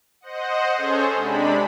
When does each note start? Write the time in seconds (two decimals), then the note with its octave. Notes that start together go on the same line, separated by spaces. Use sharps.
0.21 C5 D#5 F#5
0.76 C#4 G#4 A4 C5 C#5
1.13 C3 G#3 D4 B5